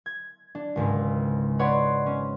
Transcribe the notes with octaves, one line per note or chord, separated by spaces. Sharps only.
G#6
D4
G#1 C#2 G#2
B4 C#5 D5 F#5 C6
C#4